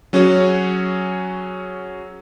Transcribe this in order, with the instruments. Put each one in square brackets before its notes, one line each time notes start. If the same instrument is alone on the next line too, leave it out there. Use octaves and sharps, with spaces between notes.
[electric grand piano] F#3 C#4 F#4 G#4 C#5